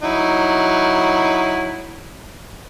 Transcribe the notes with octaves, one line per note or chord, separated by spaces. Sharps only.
F#3 D#4 E4